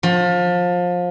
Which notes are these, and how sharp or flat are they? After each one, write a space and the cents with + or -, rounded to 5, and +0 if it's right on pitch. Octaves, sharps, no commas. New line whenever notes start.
F3 +25